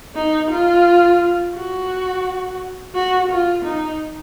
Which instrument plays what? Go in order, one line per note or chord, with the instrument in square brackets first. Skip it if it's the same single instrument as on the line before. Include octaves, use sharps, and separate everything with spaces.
[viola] D#4
F4
F#4
F#4
F4
D#4